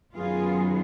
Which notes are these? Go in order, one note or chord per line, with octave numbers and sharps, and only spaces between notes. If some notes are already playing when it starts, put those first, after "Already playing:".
F#2 D#3 F#3 B3 F4 G#4